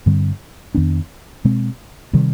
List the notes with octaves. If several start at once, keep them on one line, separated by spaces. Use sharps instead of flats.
G2 D3 G3 C4
F2 D#3 B3 D4
B2 G#3 C4
C3 D#3 G3